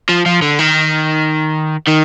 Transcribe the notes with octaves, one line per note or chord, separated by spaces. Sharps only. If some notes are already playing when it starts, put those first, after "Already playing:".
F3
F3
D3
D#3
D#3